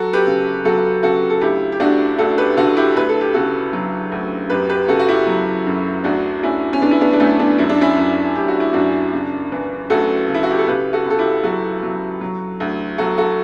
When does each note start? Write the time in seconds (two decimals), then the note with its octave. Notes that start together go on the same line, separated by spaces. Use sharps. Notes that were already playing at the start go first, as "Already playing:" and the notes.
Already playing: F#3 F#4 A4
0.13 G4 B4
0.26 C#3
0.65 F#3 F#4 A4
1.03 C#3 F#4 A4
1.30 A4
1.41 D2 E4 G4
1.72 G4
1.80 D2 D4 F#4
2.18 D2 F#4 A4
2.38 G4 B4
2.57 D3 F#4 A4
2.77 E4 G4
2.96 D2 B4
3.09 A4
3.21 G4
3.34 C#3 F#4 A4
3.73 F#3
4.12 D2
4.50 F#2 G4 B4
4.69 G4 B4
4.88 C#3 F#4 A4
4.99 F#4
5.08 E4 G4
5.27 F#3
5.67 F#2
6.04 D2 D4 F#4
6.42 D2 C#4 E4
6.73 C#4
6.81 D3 B3 D4
6.91 E4
7.01 B3 D4
7.13 D4
7.20 D2 A3 C#4
7.39 B3 D4
7.58 F#2 E4
7.69 D4
7.81 C#4 E4
7.97 F#2
8.35 F#2 G4
8.48 F#4
8.60 E4
8.73 F#2 D4 F#4
9.13 C#3
9.52 E3
9.90 D2 F#4 A4
10.28 C#3
10.34 E4
10.43 F#4
10.51 G4
10.59 A4
10.67 C#3 G4 B4
10.93 F#4 A4
11.05 C#2
11.10 A4
11.18 E4 G4
11.44 F#3 F#4 A4
11.83 F#3
12.21 F#3
12.60 D2
12.98 F#3 F#4 A4
13.18 F#4 A4